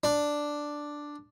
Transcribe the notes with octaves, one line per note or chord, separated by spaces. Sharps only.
D4